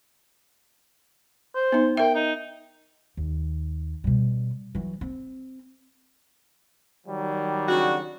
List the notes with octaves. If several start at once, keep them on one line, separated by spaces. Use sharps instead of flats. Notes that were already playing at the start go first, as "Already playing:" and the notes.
C5
B3 D#4
A#4 E5 G5
D#4
D#2
B2 G3
E3 F#3
C4
D#3 F#3 G3
C#3 D4 F#4